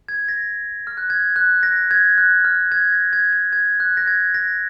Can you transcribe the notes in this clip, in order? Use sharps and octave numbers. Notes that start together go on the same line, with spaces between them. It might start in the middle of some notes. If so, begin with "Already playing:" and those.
G#6
A#6
F6
F#6
G#6
F#6
A#6
G#6
F#6
F6
G#6
A#6
G#6
G#6
G#6
F#6
A#6
G#6
A#6